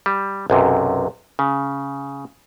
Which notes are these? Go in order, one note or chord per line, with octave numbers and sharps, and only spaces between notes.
G3
B1 F#2 C3
C#3